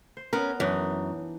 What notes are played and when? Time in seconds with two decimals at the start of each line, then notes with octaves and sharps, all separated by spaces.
0.17 C5
0.33 B3 C#4 A#4
0.60 F#2 E3 D4 D#4